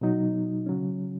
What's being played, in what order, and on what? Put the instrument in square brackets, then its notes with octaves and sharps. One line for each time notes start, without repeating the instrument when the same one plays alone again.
[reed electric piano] B2 F#3 D#4
C#3 F#3 C#4